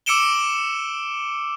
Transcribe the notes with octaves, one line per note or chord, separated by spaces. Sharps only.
D6 E6 C#7 D7 E7 G7